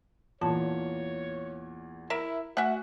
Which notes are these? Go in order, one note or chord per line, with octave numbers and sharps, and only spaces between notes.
E2 A#2 E3 F4 C#5 A5
E4 A#4 E5
A3 F#4 E5 F#5 G#5